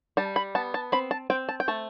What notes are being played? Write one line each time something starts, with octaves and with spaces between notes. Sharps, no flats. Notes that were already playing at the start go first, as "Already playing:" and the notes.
G3 A5
B5
B3 A5
A5
C4 B5
A5
C4 G5
A5
G5
A3 A5